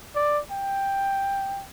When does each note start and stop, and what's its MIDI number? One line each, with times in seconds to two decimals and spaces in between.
0.15 0.40 74
0.52 1.65 79